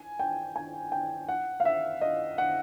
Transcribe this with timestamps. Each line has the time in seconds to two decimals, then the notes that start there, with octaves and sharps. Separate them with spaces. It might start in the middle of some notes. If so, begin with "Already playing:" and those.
Already playing: G#5
0.19 G5
0.56 G#5
0.92 G5
1.28 F#5
1.60 F5
1.65 E5
2.01 D#5
2.38 F#5